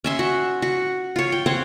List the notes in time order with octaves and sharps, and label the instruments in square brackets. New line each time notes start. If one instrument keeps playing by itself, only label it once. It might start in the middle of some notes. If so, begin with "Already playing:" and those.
[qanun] C#4 E5 C6
F#4
F#4
F4 C#5
G5
C4 C5 C#5 F#5